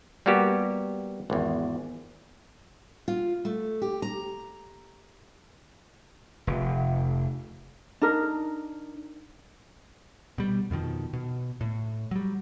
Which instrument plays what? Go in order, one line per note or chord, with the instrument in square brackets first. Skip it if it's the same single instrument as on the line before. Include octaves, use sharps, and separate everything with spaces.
[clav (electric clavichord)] G3 A#3 B3 F#4 G4
G#1 E2
[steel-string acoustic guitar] F4
A3
G4
A#5
[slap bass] F1
[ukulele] D4 D#4 A#4
[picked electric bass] B2 G3
F2 B2 D#3 F3
B2
A2
F#3 G3